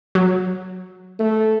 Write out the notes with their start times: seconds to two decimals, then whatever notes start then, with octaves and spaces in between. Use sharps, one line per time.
0.15 F#3
1.19 A3